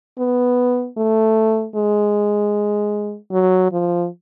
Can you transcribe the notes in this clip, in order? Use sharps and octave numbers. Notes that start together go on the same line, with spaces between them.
B3
A3
G#3
F#3
F3